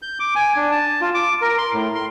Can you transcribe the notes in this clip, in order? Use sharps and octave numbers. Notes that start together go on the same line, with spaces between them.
G6
D6
G#5
D4
A5
F4
D6
A#4
C6
A2
C6